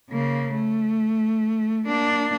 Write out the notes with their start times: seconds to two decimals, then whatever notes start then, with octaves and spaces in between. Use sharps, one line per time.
0.11 C#3 A#3
0.54 A3
1.86 A#3 D4